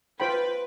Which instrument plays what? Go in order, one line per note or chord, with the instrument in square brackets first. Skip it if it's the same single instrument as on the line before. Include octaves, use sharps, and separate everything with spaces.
[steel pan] F4 C5 G5 B5 [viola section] B4